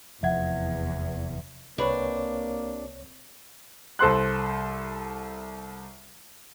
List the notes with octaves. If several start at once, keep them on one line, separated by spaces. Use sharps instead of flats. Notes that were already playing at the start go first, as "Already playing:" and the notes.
F1 E2 F3 E5 F#5 G#6
C2 C3 A#3 D4 B4 C#5 B5
C2 A4 C5 C6 F#6